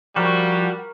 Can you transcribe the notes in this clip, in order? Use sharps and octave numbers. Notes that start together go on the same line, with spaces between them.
F3 G3 F#4 A#4 C#6